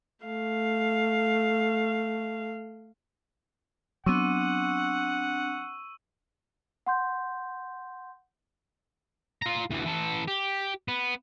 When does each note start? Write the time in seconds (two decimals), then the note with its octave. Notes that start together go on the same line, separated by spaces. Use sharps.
0.25 A3 F5
4.06 F#3 B3 C4 D4 F#5 C#6 E6 D#7
6.86 F#5 C6 G6
9.42 F4 A#5
9.70 D2 E3
9.85 E3 A4
10.28 G4
10.88 B3